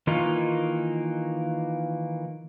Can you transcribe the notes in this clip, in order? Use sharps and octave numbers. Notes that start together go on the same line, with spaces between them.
D#3 E3 A#3 D#4 F4